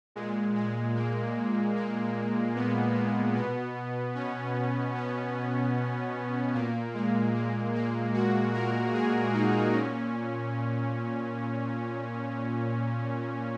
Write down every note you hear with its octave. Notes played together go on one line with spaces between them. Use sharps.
A#2 G#3
G#3
A#3
A#3
B3
A#3
B2 B3
C#4
B3
A#2 A#3
G#3
A#3
A#3
F#4
A#4
G#4
D#4
A#2 C#4